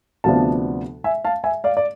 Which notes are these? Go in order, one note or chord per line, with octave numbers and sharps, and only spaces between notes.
D2 C3 F3 B3 D4 F5 A5
E5 G#5
F5 A5
E5 G#5
D5 F5
D5